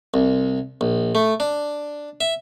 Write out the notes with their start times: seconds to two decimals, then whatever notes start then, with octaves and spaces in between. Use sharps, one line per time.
0.14 C2
0.81 A#1
1.15 A3
1.40 D4
2.21 E5